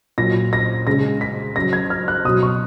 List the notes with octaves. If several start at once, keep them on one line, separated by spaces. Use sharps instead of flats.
A#2 F#3 A#6
A#6
C#3 G#3 A#6
B6
C#3 F#3 A#6
G#6
F6
F#6
B2 F#3 D#6
C#6